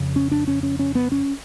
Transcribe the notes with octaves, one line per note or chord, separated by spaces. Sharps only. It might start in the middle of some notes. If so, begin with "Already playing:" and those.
Already playing: F2 C#3
C#4
D4
C#4
C#4
C#4
B3
C#4